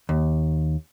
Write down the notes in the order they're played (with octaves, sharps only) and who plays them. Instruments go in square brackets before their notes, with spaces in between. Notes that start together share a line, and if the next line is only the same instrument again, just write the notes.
[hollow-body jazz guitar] D#2